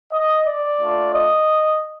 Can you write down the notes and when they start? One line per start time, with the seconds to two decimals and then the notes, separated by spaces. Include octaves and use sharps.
0.12 D#5
0.46 D5
0.80 A3 D4 F4
1.13 D#5